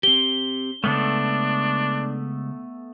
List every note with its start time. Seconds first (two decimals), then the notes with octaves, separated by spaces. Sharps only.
0.03 C4 G4 G7
0.84 C#3 G#3 A3 B3 D4 A4